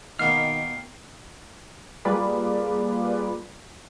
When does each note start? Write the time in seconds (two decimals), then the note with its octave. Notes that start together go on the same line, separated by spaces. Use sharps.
0.19 B2 D#3 A#3 B3 G5 F6 C7
2.05 G3 A#3 F4 G#4 B4 D5